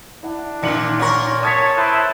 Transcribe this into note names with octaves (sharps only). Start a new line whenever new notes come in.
D4 E4 F#5
A#1 A#2 D#3 C#7 F#7
C#4 A#4 F#5 C#6
C#5 A5 D#6 G#6 B6
E4 B4 C5 A5